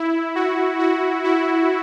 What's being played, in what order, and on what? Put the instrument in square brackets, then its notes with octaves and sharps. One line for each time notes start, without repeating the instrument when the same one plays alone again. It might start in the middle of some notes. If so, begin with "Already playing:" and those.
Already playing: [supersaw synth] E4
F#4
F#4
E4